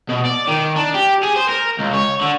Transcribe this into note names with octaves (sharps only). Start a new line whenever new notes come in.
B2
D5
D#3
D4
G4
G#4
C5
A#4
C#2
C#5
D3